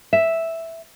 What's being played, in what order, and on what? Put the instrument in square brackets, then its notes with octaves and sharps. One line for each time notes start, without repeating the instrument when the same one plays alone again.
[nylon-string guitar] E5